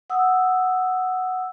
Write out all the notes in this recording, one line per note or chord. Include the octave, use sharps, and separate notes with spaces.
F#5 D#6 E6